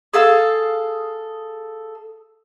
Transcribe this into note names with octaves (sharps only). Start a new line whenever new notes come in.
G#4 A4 F5 E6